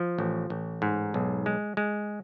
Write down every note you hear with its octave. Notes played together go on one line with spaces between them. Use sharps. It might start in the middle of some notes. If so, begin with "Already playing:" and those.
Already playing: F3
A1
A1
G#2
B1
G#3
G#3